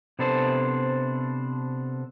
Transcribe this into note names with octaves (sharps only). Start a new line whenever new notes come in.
C3 B3 D4 A4 C5